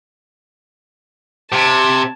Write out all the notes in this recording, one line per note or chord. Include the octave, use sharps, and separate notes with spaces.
C3 A5 G#6